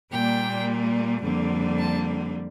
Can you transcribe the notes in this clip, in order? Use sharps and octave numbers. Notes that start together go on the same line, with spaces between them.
A#2 G3 A#3 G5
F2 D3 G3 A#3
A5